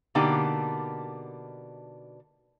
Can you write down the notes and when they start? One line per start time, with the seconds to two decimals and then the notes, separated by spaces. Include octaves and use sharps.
0.15 B2 D3 A#3 D4 D#4 G4